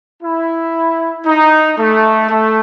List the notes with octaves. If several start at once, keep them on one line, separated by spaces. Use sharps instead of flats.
E4
D#4
A3
A3